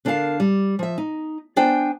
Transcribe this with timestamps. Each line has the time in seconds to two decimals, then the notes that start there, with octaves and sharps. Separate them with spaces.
0.05 D3 D4 A#4 C#5 F5 A5
0.40 G3
0.79 F3 E5
0.98 D#4
1.56 B3 D4 C5 G5 G#5